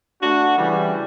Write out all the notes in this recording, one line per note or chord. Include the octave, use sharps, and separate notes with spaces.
A3 D4 F#4
C#3 E3 G3